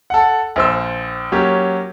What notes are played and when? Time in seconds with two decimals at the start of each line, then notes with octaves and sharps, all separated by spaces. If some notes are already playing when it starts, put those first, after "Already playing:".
0.10 A4 F#5
0.56 A#1 C5 E6
1.32 F#3 A#3 C#4 G4